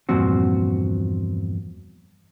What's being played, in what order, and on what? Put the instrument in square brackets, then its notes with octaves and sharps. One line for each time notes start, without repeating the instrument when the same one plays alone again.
[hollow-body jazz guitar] E2 G2 A#2 F3 C4 F#4